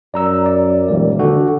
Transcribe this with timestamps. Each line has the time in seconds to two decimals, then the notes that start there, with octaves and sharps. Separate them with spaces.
0.14 F#2 D5 A#5 E6
0.46 D5
0.88 D#1 E3 G#3 D5
1.19 D3 F#4 A4 F#5